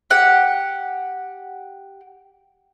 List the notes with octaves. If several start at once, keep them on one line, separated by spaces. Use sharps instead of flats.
G4 F#5